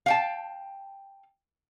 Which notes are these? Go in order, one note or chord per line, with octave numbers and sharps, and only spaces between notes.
F5 G5 A5